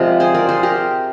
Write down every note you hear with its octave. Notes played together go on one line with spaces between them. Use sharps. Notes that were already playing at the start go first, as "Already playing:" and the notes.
Already playing: C3 F3 G#3 A#4 D5
G#4 C5
A#4 D5
G#4 C5
G4 A#4